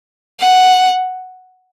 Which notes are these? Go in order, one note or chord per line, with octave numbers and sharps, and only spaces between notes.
F#5